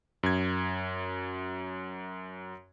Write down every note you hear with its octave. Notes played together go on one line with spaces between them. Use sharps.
F#2 G#6